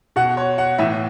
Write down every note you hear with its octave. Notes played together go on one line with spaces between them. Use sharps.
B2 F#5
C#5
F#5
A2 E3 E5